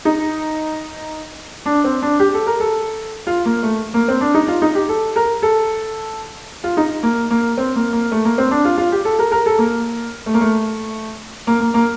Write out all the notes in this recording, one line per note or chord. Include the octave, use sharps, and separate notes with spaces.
D#4
D4
C4
D4
G4
A4
A#4
A4
F4
A#3
A3
A#3
C4
D4
D#4
F4
D#4
G4
A4
A#4
A4
F4
D#4
A#3
A#3
C4
A#3
A#3
A3
A#3
C4
D4
F4
F4
G4
A4
A#4
A#4
A4
A#3
A3
A#3
A3
A#3
A#3
A#3